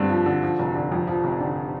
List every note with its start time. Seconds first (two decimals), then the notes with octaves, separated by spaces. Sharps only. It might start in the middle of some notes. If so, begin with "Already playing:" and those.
Already playing: G2 D3 C4
0.10 F3
0.26 D3
0.43 F3
0.59 F1
0.75 D3
0.92 F2
1.07 F3
1.24 F1
1.40 D3